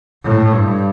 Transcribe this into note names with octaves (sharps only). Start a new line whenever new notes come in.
A2
G2